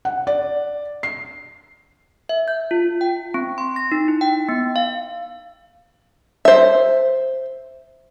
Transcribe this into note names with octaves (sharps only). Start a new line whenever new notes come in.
F#5
D5
C7
E5
G6
F4
G5
C4
C6
A#6
D#4
E4
G5
B3
F5
C5 E5